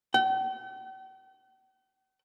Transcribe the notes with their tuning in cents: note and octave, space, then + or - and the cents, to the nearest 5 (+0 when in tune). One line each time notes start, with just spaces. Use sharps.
G5 -45